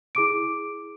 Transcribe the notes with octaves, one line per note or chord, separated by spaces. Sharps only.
E4 G#4 D6 D7